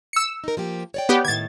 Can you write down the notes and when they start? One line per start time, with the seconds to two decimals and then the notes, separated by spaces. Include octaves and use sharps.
0.13 E6 C#7
0.44 D#4 A#4
0.57 F3 A#3 G4
0.94 C#5 D5 G5
1.09 B3 G4
1.25 A2 D#3 G#6 A6